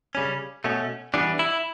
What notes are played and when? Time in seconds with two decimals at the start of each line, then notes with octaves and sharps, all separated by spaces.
0.15 C#3 G3 C#4
0.64 B2 A3 C#4
1.14 E3 G3 B3 D4
1.39 E4